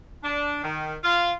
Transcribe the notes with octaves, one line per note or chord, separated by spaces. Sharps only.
D4
D#3
F4